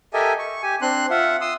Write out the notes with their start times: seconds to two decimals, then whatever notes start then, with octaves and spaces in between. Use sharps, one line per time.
0.13 G4 A4 A#4 D#5 E5 G#5
0.39 C#6
0.62 G4 G#5
0.82 C4 D4 C6 F#6
1.10 F4 E5 F#5
1.41 C6 D#6 E6